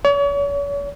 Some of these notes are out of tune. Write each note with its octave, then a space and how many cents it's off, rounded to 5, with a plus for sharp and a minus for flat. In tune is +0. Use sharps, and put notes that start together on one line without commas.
C#5 +40